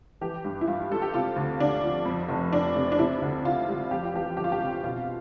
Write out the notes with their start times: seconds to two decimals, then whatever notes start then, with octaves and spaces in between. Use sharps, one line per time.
0.21 E3 G4
0.45 G2
0.61 E4
0.67 G2 F4
0.91 G3 A4
1.02 G4
1.14 C3 F4
1.36 D2
1.60 D2 D4
1.84 F3
2.05 F2
2.29 F1
2.53 F1 D4
2.76 C3
2.92 D4
2.99 C3 E4
3.22 D2
3.45 D2 F4
3.68 G3
3.91 F2 G4
4.03 F4
4.14 E3 G4
4.37 G1 G4
4.44 F4
4.52 G4
4.61 C3
4.83 B2 F4